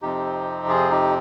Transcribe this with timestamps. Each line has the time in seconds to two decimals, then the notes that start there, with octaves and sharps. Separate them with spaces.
0.02 F2 C3 F3 C4 D#4 G4
0.68 F4 G#4
0.91 D#4 G4